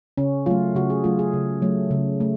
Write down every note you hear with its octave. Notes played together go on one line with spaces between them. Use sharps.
C#3 C#4
F#3 A3 F4
C#3 F#4
G#4
F#3 A3 F4
G#4
C#3
F#3 A3
C#3
A3